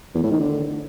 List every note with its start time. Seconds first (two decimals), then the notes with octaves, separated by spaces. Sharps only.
0.15 E2
0.23 A2
0.31 D#3
0.40 D3